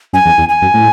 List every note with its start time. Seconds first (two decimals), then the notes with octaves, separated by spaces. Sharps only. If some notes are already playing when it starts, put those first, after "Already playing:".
0.13 F#2 G#5
0.25 E2
0.38 E2
0.49 G#5
0.62 F#2
0.74 A2